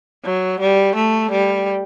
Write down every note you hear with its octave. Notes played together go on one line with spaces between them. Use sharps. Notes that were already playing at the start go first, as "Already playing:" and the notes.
F#3
G3
A3
G3